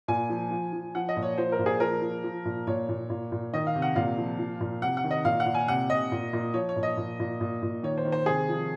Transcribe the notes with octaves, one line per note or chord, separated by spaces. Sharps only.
A#2 G#5
F3
F3
F3
F3 F#5
D#5
A#2
C#5
F3 C5
A#4
A#2
G#4
F3 A#4
F3
F3
A#2
A#2 C#5
A#2
A#2
A#2
D#3 D#5
F5
C3
F#5
A#2 F5
F3
F3
A#2
C3 F#5
F#5
D#3
D#5
A#2 F5
F#5
A#2
G#5
C3 F#5
C3 D#5
A#2
A#2
F3 C#5
C#5
A#2
D#5
A#2
A#2
A#2
A#2
D#3 C#5
C5
D#3
C5
C3 G#4
F3